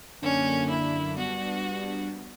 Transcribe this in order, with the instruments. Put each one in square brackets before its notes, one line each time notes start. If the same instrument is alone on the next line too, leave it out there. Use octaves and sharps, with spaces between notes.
[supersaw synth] F#2 D3 A#3 D4 [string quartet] C#4
[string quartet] E4
[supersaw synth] G3 B3 D4 [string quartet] F#4